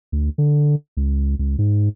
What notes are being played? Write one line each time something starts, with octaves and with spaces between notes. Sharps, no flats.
D2
D3
C#2
C#2
G#2